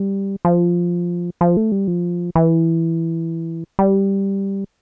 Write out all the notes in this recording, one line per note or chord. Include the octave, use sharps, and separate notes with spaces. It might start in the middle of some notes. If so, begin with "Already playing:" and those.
Already playing: G3
F3
F3
A3
G3
F3
E3
G3